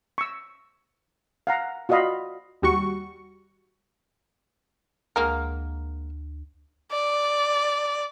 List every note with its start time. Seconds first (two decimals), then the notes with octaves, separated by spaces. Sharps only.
0.18 C#6 E6
1.47 F5 F#5 A#5
1.89 F4 F#4 D5 D#5 F5 B5
2.62 D#2 G3 F#4 C#6
5.16 D2 G#3 A#3 A#4
6.92 D5